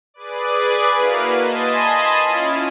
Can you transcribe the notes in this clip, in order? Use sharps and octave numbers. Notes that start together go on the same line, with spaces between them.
G#4 B4 D5
A#3 E4 F#4 A#4 B4 F5
D#5 G#5 A5 B5 C6 D#6
C#4 E4 F4